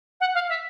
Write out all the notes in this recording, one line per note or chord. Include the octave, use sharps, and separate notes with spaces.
F#5
F5
E5